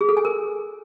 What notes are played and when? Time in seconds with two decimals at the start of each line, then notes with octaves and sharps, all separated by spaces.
0.01 G#4
0.09 A4
0.17 G#5
0.25 A#4